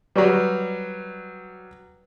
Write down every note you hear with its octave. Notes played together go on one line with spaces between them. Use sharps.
F#3 G3 B4 D5 C#6